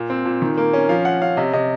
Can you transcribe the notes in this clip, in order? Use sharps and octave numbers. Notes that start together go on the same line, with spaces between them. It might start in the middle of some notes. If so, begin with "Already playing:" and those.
Already playing: A#2
C4
A#2
D#3
A#3
C#4
F3 F5
C#4 F#5
C#4 F5
C3 D#5
C3 D#5